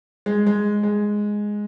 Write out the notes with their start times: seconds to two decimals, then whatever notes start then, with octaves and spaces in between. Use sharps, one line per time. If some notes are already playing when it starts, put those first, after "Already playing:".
0.26 G#3
0.47 G#3
0.83 G#3